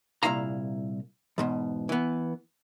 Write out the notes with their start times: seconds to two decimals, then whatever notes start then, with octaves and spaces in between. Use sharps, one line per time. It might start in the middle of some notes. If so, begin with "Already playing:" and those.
0.23 C2 G2 A#2 E4 F5 A#5
1.38 E2 G#2 B2
1.89 E3 B3